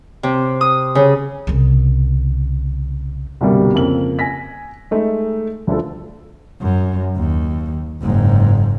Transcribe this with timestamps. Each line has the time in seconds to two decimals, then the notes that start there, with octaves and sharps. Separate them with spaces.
0.23 C3
0.61 D#6
0.95 C#3
1.47 C2 C#3
3.41 C2 G2 B2 D3 G3 A#3
3.75 F2 C#3 A#3 F#7
4.19 G#5 A#6 B6
4.91 G#3 A3 D#4
5.67 D2 D3 F3 A4
6.61 F#2
7.16 D#2
8.02 F#1 G#2